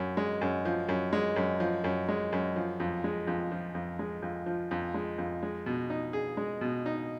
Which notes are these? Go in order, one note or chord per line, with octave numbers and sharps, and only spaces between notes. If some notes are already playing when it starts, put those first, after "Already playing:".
Already playing: F#2
G#3
F#2
F3
F#2
G#3
F#2
F3
F#2
G#3
F#2
F3
F2
G#3
F2
F3
F2
G#3
F2
F3
F2
G#3
F2
G#3
B2
D#4
G#4
G#3
B2
D#4